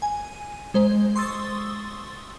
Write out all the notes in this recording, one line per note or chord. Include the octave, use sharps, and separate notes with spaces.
G#5
G#3 C5
C6 C#6 D#6 E6 A6